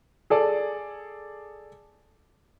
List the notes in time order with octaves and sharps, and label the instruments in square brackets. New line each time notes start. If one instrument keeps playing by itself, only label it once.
[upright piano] G#4 A4 D5